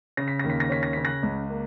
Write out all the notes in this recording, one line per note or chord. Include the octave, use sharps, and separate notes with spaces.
C#3 A#6
B6
D#2 A#6
B6
A#6
C#4 B6
A#6
C#3 B6
F#6 A#6
C#2
A#3